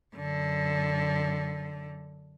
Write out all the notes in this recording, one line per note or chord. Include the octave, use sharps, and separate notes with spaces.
F#2 D3